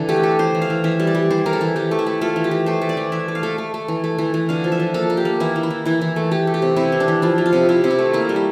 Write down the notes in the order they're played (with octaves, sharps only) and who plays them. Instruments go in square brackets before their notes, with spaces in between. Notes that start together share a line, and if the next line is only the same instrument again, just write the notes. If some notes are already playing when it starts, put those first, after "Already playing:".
Already playing: [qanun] D3 E3
A3 G4
A3 A4
E3 C5
E3
F5
E3
E3 E5
G3
D5
G3
E3 C5
E3 A#4
A4
E3
E3 G4
A3
E4
A3
A3 F4
E3
G4
E3
A3 C5
A3
D5
E3
E3 E5
A3
F5
A3
A3
A3
E3
A3
E3
E3
D3 F5
F3
E5
F3
A#3 A4
A#3
G4
A#3
E3 E4
E3
E4
E3
E3 E4
E3
A3
A3 G4
A3
G4
C3
C3 E4
E3
D4
E3
F3 E4
F3
F4
C3
C3 E4
C3
E4
A3
A#3 E4
G3
E4